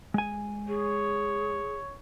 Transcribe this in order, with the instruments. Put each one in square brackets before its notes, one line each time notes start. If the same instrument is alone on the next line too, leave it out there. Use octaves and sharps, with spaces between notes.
[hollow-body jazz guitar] G#3 G#5
[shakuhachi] G#4 [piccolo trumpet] C#5